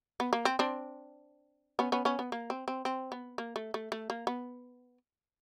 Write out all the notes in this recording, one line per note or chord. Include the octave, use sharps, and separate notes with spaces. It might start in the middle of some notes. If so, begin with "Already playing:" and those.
B3
A#3
C4
C4 D4
B3 C#4
B3 C#4
B3 C#4
B3
A#3
C4
C4
C4
B3
A#3
A3
A3
A3
A#3
B3